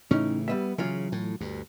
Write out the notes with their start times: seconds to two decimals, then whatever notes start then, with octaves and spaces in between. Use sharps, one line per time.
0.11 A2 C#3 E3 C#4 D#4
0.48 G3 B3 E5
0.78 C#3 E3 F#3 F4
1.12 A2
1.41 D2 G2